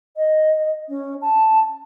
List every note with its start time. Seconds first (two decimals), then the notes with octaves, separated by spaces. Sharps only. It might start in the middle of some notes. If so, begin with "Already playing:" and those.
0.17 D#5
0.89 C#4
1.21 A5